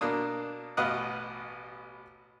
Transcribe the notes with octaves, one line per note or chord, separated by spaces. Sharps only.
B2 A#3 D4 D#6
A1 B2 B4 D#5 F5 F#5